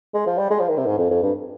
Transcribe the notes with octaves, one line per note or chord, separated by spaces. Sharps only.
G#3
F3
G3
G#3
F3
D#3
C3
G#2
F2
F2
G2